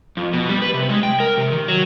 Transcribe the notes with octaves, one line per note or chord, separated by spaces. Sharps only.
F2
B2
G3
B4
C3
G#3
G5
A#4
C3
D#3
F#3